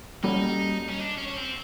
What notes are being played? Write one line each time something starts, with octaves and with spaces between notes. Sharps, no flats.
G3 A#3 C#4 D#4 F#4 A4
C#4
D4
C#4
C#4
C4